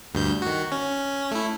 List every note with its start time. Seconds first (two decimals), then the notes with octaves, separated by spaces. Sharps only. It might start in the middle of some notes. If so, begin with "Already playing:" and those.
0.14 D2 G2 G6
0.42 D#3 F#4
0.72 C#4
1.31 A3 E4